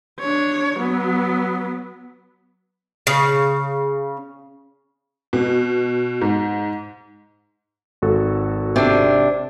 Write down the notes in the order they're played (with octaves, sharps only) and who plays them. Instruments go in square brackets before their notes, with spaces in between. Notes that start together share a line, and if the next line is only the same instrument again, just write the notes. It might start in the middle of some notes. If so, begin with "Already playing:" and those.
[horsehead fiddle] D4 C#5
F#3 B3
[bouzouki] C#3
[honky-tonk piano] B2
G#2
[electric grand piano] G#1 F#4 A4
[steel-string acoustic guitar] C3 D4